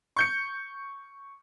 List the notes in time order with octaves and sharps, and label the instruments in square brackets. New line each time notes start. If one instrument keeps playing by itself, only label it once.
[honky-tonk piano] C#6 G6 C#7